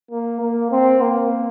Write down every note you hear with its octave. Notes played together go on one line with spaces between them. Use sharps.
A#3
A#3
C4
A#3